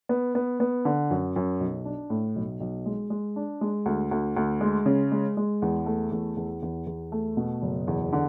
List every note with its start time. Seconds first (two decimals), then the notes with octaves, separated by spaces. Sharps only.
0.09 B3
0.35 B3
0.60 B3
0.85 D3
1.10 F#2
1.36 F#2
1.61 B1
1.85 D4
2.10 A2
2.36 B1
2.60 B1
2.86 G#3
3.10 G#3
3.36 D4
3.61 G#3
3.86 D2
4.11 D2
4.37 D2
4.61 G#3
4.86 C#3
5.12 G#3
5.37 G#3
5.62 E2
5.86 A3
6.11 E2
6.37 E2
6.62 E2
6.87 E2
7.12 A3
7.37 B2
7.62 F#1
7.88 E2
8.13 D3